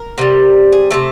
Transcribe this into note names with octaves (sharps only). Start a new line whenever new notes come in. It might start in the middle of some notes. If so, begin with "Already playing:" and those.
Already playing: A#4
C3 E3 G3
G#4
C3 E3 A3 A4